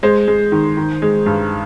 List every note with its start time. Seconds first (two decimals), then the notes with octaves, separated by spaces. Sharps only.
0.03 G#3 C5
0.28 G#3
0.52 D#3
0.77 D#3
1.02 G#3
1.26 G2